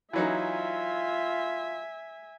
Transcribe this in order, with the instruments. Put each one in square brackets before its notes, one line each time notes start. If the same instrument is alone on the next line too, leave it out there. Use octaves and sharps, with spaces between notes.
[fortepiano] E3 F#3 D#4 [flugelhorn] F4 [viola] E5 G#5